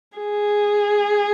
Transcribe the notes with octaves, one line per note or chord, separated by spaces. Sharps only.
G#4